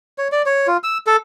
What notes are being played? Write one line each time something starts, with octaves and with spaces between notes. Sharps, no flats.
C#5
D5
C#5
F4
E6
A4